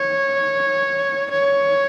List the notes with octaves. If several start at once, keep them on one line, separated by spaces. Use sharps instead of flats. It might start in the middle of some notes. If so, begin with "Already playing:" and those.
Already playing: C#5
C#5